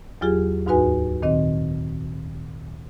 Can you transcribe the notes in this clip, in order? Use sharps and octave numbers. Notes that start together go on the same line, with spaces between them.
E2 F#3 F4 G4 G#4
D2 G#2 D#4 F#4 B4 G#5
A#2 D#3 C4 D#5